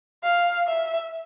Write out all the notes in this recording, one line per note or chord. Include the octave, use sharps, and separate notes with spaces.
F5
E5